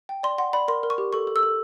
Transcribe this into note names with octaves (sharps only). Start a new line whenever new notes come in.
G5
D5 C6
F#5 C6
D5 B5
A#4 C6
A#4
C#6
G4
A4 C#6
A4
E6
A4